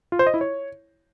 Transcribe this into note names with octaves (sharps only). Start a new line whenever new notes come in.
F4
C5
D#5
E4
C#5